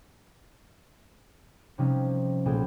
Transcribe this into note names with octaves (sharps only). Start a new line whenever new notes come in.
C3 F3 G3 C#4 D#4
B1 A#2 G#3 G#4 G5 E7